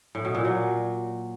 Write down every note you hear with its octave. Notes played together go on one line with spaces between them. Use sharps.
A2
B2
A#2
F#3